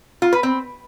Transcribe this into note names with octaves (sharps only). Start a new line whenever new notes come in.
F4
B4
C4